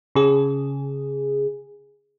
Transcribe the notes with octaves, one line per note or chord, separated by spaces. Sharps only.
C#3 G#4